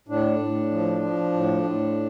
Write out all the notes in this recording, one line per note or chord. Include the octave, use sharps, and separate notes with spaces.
A2 D4
A2
F3
F3
A2
A2